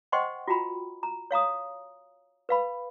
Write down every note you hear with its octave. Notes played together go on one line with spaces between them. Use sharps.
C5 D#5 F#5 G5 C6 C#6
F4 F#4 G5 A#5 B5
A#5
C#5 F5 A#5 D#6
B4 F5 B5